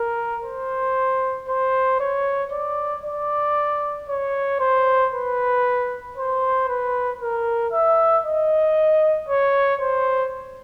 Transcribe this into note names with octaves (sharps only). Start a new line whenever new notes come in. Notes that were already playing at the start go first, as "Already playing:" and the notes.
Already playing: A#4
C5
C5
C#5
D5
D5
C#5
C5
B4
C5
B4
A#4
E5
D#5
C#5
C5